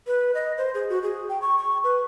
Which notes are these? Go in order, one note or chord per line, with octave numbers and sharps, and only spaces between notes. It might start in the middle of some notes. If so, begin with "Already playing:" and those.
B4
D#5
C5
G#4
F#4
G#4
G5
C#6
C#6
B4